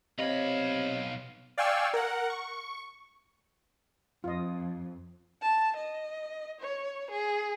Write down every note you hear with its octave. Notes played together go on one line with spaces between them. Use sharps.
B1 C3 C#5 D#5 F5 B5
D5 F5 G5 G#5 C#6 E6
A#4 F#5
C#6
F2 F4 D#5
A5
D#5
C#5
G#4